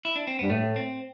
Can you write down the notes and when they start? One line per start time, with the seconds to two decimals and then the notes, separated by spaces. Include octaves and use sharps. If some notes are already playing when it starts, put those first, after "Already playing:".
0.05 E4
0.16 D4
0.27 C4
0.39 G2 B3
0.50 A2 A3
0.76 C4